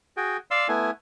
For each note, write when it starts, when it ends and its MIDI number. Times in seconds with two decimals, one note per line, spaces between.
0.17 0.37 66
0.17 0.37 68
0.17 0.37 79
0.51 0.68 74
0.51 0.68 77
0.51 0.68 84
0.51 0.68 88
0.68 0.91 57
0.68 0.91 59
0.68 0.91 64
0.68 0.91 80